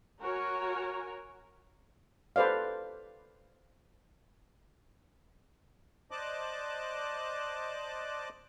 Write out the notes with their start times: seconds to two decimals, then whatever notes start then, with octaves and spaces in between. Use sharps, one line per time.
0.20 F#4 A#4 C#5 G#5
2.36 A4 B4 C5 D5 F5
6.11 C5 D5 D#5 A5 D6 F#6